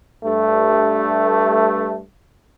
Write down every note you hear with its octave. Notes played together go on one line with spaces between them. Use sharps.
G2 A3